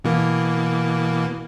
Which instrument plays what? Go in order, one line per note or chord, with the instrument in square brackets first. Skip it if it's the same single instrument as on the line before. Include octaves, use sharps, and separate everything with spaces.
[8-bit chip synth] B2 E3 A#3